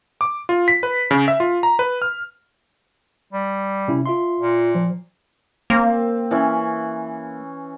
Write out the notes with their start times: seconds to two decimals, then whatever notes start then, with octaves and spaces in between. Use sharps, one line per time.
0.21 D6
0.49 F4
0.68 B6
0.83 B4
1.11 C#3
1.28 E5
1.40 F4
1.63 A#5
1.79 B4
2.02 F6
3.33 G3
3.88 C3 C#4 E4
4.06 F4 E5 C6
4.40 A#2
4.75 F3
5.70 A#3 C4
6.31 E3 C#4 E5